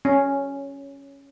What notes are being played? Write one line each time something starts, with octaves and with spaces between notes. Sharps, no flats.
C#4